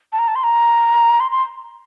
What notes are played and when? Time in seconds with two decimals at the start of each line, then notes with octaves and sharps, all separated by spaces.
0.13 A5
0.19 A#5
0.28 A5
0.35 C6
0.44 A#5
1.20 C6
1.31 C6